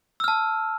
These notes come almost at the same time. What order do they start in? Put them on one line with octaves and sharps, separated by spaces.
E6 F6 A5